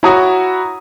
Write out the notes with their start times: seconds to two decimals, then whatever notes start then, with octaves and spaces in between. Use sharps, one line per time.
0.03 E4 F#4 C#5 A#5 D#6